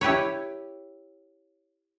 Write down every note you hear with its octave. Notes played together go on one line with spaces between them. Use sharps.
E4 G4 B4 C#5